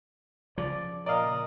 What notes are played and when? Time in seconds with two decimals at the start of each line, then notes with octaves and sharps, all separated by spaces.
0.58 C#3 F3 D5
1.06 A#2 A#4 D5 D#5 F5